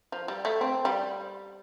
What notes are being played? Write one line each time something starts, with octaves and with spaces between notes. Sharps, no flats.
F3
G3
A3
C4
G3